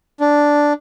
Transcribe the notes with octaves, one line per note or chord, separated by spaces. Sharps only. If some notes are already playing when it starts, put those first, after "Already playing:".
D4